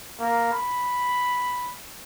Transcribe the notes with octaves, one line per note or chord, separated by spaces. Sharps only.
A#3
B5